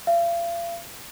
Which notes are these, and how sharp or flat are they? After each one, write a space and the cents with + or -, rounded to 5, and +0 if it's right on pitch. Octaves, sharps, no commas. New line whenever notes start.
F5 -40